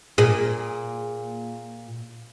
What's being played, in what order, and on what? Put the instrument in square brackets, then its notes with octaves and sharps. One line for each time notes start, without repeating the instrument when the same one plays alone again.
[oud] A#2 G#4